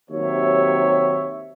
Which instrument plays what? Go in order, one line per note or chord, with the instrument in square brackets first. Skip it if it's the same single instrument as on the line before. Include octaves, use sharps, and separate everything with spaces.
[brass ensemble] D#2 C3 F#3 C#5 E5